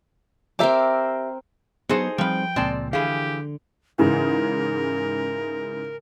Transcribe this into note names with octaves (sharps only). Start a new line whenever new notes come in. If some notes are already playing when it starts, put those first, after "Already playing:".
C4 G4 A#4 E5 D6
F#3 B3 D#4 F#4 G#4 A4 C5
F3 G3 A3 C4 B4 G5
C#2 A#2 G#3 C4 D5 A5
D3 E3 G4 G#4 F5
G#2 C#3 E3 A#4